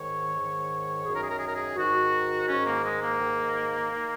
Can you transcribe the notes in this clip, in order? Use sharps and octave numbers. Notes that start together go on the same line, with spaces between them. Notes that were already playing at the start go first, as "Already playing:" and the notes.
Already playing: G#2 D#3 C#5
G#2
D#3
F#2 D#3 G#4
A#4
G#4
A#4
G#4
A#4
G#4
G#2 D#3 F#4
G#2 D#3 C#4
A#3
G#3
A#3
G#2 D#3
D#3